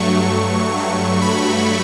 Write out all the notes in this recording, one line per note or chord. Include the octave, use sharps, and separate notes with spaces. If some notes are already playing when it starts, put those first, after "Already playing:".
Already playing: G2 F#3 A3 C#6
G2 F#3 A3
B5